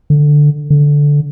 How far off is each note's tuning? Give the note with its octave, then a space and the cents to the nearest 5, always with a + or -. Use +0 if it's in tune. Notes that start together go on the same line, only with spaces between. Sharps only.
D3 +5
D3 -10